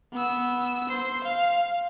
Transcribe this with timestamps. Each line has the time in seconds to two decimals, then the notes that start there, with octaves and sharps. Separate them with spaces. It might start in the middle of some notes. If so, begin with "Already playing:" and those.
0.13 B3 E6
0.89 C5 C7
1.24 F5